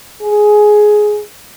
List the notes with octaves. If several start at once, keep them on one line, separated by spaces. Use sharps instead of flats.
G#4